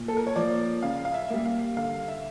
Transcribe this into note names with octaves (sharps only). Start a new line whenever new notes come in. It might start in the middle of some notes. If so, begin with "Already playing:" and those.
Already playing: A#2
A4
A#4
C#5
F3 A#3 D5
C#3 F5
F5
E5
G3 A#3
F5
D3 F5
E5